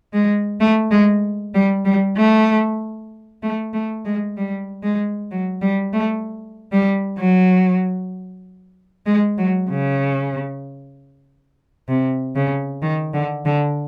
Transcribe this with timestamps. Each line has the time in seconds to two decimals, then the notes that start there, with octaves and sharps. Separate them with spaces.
0.13 G#3
0.60 A3
0.91 G#3
1.54 G3
1.85 G3
2.17 A3
3.43 A3
3.73 A3
4.05 G#3
4.37 G3
4.83 G#3
5.31 F#3
5.61 G3
5.93 A3
6.72 G3
7.18 F#3
9.06 G#3
9.37 F#3
9.70 C#3
11.89 C3
12.35 C#3
12.82 D#3
13.13 D3
13.45 D3